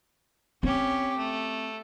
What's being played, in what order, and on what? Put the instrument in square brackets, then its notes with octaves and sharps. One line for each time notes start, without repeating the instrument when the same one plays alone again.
[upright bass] C4 [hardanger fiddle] C#4 G4
[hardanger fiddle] A3